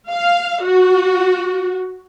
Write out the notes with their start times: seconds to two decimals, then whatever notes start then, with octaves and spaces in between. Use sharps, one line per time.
0.10 F5
0.62 F#4